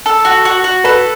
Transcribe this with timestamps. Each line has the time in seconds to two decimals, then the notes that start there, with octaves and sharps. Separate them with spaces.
0.06 A4
0.25 F#4
0.45 F#4
0.64 F#4
0.84 A4 B4